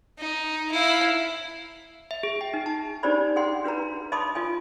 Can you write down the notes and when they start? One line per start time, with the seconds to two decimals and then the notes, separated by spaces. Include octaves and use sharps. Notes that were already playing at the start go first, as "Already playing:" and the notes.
0.18 D#4
0.71 E4 F5
2.11 E5
2.23 G#4
2.41 G5
2.54 D#4
2.66 A5
3.03 D4 D#4 G4 C5 D5 B5
3.36 G#4 F#5 G5 C6
3.64 D4 F#4 B4 A#5
4.12 D#5 A5 B5 C6 D6 D#6
4.35 F4 D#5 G#5